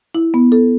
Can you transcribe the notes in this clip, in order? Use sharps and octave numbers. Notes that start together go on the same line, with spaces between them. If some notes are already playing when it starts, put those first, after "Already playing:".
E4
B3
A4